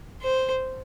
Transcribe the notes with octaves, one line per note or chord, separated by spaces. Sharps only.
C5